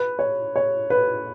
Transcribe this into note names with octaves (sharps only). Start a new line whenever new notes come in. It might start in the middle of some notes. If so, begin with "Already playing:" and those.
Already playing: B4
C#5
C#5
B4